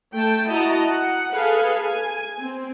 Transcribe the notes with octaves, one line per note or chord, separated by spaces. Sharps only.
A3 G5 A5
E4 F#4 D#5 A5 A#5
F#5
G#4 A4 B4 F5 G#5
G#5
C4